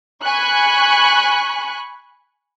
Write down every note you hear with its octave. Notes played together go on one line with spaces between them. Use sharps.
G#5 B5 C#6 F#6